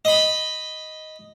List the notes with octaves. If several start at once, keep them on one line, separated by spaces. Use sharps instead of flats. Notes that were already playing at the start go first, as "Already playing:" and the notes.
D#5 B5